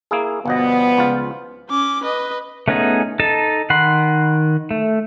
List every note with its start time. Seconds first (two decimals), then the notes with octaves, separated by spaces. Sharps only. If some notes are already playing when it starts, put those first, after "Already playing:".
0.11 A#3 E4 G#4
0.46 G1 B2 F3 G3 B3 D#5
0.97 C#2 F4
1.69 C#4 D6
2.03 B4 D#5
2.68 A3 B3 C#4 D#4 G#4
3.20 D#4 A4 A5
3.70 D#3 F#5 B5 C6
4.71 A3